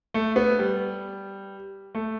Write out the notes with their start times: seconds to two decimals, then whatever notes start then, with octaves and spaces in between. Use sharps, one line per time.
0.14 A3
0.36 B3
0.59 G3
1.95 A3